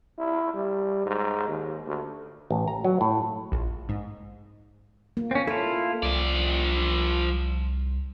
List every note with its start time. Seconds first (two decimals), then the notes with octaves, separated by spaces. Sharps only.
0.18 E4
0.54 G3
1.06 G#2
1.48 D#2
1.86 D2
2.50 A1
2.68 A#5
2.84 F#3
3.01 A2
3.52 A#1
3.89 G#2
5.17 A#3
5.31 C4 C#4
5.47 E4 F4 A4
6.03 C2 F3 D5